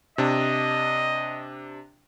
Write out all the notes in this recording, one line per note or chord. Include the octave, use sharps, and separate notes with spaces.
C3 D4 D#5